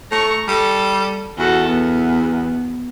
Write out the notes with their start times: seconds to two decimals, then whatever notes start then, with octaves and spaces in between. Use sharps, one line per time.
0.12 A3 A#5 C#6
0.48 G3 A4
1.38 E2 F#4 A4
1.68 B3